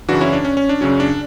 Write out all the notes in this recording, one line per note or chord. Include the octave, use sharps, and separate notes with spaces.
F#2 C#3 E3 D4 F#4
C#4 E4
D4
C#4
C#4
D4
F#2 C#3 F#3 C#4
D4